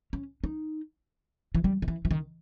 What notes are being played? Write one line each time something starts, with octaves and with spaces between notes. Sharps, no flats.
C#4
D#4
E3
G3
D#3
E3
E3
D#3